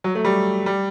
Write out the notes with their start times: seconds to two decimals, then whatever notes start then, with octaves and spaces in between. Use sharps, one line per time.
0.04 F#3
0.15 A3
0.25 G3
0.66 G3